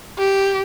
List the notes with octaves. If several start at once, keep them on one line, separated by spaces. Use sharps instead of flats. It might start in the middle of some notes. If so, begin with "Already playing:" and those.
G4